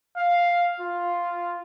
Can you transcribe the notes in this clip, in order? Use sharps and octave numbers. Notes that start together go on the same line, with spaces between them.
F5
F4